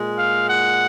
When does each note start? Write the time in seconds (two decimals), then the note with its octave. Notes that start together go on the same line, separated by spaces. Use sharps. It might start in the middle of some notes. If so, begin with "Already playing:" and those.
Already playing: A#2 G#3
0.19 F5
0.48 F#5